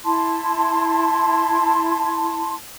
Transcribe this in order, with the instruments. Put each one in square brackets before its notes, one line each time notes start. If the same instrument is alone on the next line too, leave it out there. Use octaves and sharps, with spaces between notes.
[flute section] E4 A5 C6